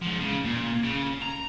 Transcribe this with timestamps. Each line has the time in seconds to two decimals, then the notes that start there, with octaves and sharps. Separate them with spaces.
0.02 G#2 F3
0.20 C#3
0.45 A#2
0.83 C#3
1.22 A#5